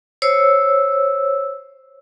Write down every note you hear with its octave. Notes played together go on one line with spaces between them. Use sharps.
C5 C#5 E6